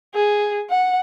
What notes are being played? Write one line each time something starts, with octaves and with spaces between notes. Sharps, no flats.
G#4
F#5